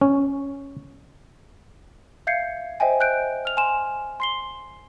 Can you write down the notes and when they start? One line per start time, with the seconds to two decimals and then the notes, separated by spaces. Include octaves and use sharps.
0.01 C#4
2.27 E5 F5 G6 G#6 C7 C#7
2.80 C5 D#5 E5 G5 G#5
3.00 F#6 G6 D7
3.45 F6 F7
3.57 G#5 C6 E7
4.20 C6 C7 G7